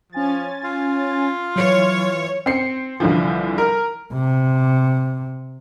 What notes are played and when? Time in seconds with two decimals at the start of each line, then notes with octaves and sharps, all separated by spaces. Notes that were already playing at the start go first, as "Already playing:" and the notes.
0.12 F3 C#4 G#5 A6
0.64 F4
1.56 E3 F#3 C#5
2.46 C4 C7 C#7
3.00 C2 D3 E3 F3
3.58 A#4
4.13 C3